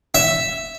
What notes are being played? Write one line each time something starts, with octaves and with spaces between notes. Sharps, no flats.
E5